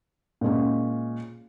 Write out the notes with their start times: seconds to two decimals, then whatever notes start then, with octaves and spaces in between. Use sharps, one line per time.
0.41 A#2 G#3 C#4